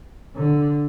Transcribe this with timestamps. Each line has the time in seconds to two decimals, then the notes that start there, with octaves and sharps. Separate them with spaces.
0.36 D3